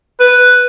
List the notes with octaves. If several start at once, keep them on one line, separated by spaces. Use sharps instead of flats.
B4